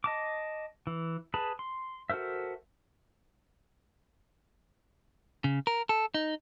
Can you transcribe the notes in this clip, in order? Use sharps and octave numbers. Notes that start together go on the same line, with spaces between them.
D#5 A5 D6
E3
G#4 B4 A5 B5
C6
F#4 A4 A#4 C5 E5
C#3
A#4
A4
D#4